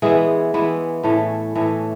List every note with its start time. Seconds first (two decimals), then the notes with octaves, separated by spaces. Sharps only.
0.02 E3 G#3 B3 E4 G#4
0.54 E3 G#3 B3 E4
1.03 A2 E3 A3 C#4
1.55 A2 E3 A3 C#4